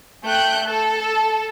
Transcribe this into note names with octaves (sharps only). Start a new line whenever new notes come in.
A3 G5 F#6 G6
A4